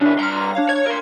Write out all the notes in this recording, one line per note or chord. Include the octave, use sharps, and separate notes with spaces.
C#3 D4 E4
G2 A#5 C6 F6
D4 C#5 F5
C#5 G#6
A#4 C6